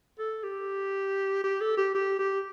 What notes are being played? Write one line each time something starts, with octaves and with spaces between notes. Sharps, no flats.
A4
G4
G4
A4
G4
G4
G4